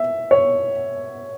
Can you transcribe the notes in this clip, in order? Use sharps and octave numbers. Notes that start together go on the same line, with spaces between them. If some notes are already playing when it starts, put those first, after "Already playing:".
Already playing: E5
C#5